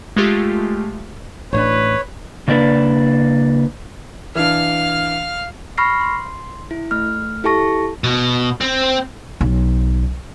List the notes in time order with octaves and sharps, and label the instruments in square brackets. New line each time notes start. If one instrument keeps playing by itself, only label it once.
[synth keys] G#3 A3 F4 G4
[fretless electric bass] A1 A2 D4 [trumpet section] B4 [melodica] C#5
[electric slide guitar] C#3 A#3 D4 B4 D5
[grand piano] E3 D4 [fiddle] F5 F6
[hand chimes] B5 C#6 F6 A#6 C7
C6
E4
A3 F6
E4 G4 A4 A5 C#6 A#6
[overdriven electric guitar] B2
C4
[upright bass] B1